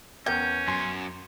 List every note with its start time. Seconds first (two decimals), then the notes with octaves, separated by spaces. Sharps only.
0.26 E2 C#4 A#4 G5 G6
0.68 F#2 G#5 C6